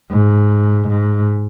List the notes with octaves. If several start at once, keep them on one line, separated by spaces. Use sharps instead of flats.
G#2
G#2